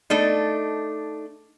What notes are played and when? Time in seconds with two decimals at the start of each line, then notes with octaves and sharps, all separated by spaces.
0.10 A3 D4 D#4